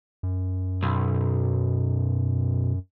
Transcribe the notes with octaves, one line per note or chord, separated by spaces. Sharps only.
F#2
B1